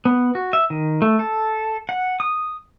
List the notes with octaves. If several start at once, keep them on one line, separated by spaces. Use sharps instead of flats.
B3
F#4
E5
D#3
A3
A4
F#5
D#6